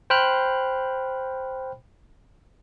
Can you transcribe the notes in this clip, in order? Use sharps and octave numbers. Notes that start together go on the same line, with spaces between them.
C5 G5 B5 F6 F#6